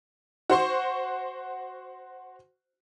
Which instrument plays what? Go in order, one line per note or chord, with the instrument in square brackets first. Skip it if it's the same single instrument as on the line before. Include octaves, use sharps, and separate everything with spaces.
[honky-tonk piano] F#4 C5 C6 C#6